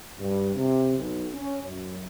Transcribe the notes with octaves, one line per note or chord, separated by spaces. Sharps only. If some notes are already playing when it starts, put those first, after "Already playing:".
G2
C3
B1
C#4
F#2